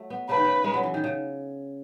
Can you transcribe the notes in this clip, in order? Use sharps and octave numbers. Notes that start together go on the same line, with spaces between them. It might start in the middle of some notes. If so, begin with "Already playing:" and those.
Already playing: F#3 A3
B3
C#3 B4
D#3
C#3
G#3
F#3
E3
D#3
C#3